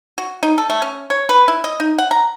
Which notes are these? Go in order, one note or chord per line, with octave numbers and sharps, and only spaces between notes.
F#4
D#4
A4
A3
C#4
C#5
B4
E4
D#5
D#4
F#5
A#5